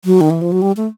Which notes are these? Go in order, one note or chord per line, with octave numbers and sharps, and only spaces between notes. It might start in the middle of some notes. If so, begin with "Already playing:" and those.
F#3
D#3
E3
F3
F#3
G3
A3